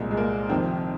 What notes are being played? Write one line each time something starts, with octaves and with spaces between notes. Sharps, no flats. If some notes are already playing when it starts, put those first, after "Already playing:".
Already playing: C2 A#2 G#3
G#3
A#3
F2 C3 D#3 C4